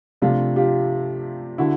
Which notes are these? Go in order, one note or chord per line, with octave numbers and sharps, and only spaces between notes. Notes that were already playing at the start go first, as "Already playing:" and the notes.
C3 F3 A3 D4 F4 G4
F4 G4
D3 E4 F#4